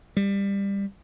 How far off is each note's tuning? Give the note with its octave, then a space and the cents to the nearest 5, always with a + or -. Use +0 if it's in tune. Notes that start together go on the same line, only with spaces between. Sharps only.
G3 +20